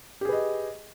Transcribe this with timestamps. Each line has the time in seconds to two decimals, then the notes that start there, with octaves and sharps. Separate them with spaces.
0.21 G4
0.25 G#4
0.29 B4
0.33 D#5